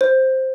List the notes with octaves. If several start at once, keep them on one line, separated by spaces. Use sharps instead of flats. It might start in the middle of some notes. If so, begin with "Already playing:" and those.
C5